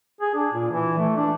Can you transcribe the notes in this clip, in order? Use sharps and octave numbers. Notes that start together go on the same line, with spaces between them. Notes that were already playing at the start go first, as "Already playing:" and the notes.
G#4
D4
A#2
E3
A3
D4